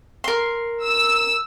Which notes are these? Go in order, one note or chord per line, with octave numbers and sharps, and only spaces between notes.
A#4 C6
E6